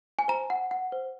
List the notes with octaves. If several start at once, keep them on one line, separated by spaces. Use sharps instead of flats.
G#5
C5 A#5
F#5
F#5
C5